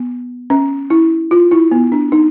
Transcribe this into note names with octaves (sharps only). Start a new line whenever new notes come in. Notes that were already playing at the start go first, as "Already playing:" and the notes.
Already playing: B3
C#4
E4
F4
E4
B3
D4
D#4